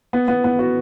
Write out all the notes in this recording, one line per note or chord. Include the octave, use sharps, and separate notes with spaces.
B3
B3
B3
F#4